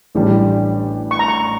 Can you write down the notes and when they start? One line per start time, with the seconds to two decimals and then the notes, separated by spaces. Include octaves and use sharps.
0.15 A1 A2 G3 D4
1.11 C#6
1.19 A#5
1.28 C#6